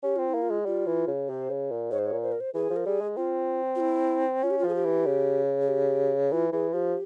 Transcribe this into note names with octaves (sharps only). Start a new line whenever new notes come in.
C#4 G4
C4 F4
E4
A#3
F4
G#3
G3 F4
E3
C#3
C3 C5
C#3
A#2
G#2 C#5
C5
C#5
A#2
C5
A#4
C5
E3 G#4
F3
A#4
G3 G#4
G#3
C4 F4
F4
E4
C#4 F4
G4
F4
F3 G#4
G4
E3
C#3
G#4
G4
E3 F4
E3 G#4
F3 G4